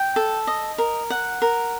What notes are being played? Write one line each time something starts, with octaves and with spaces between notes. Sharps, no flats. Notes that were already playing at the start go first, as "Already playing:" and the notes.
Already playing: G5
A4
D#5
A#4
F#5
A#4